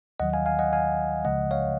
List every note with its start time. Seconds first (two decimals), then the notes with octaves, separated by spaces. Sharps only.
0.20 D#2 D#3 F#3 D#5 F#5
0.34 F5 G#5
0.46 F5 G#5
0.59 D#5 F#5
0.73 F5 G#5
1.25 C#2 C#3 F3 G#3 D#5 F#5
1.51 C#5 F5